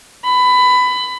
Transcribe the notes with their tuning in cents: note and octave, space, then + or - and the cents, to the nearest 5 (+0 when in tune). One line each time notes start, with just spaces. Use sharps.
B5 +20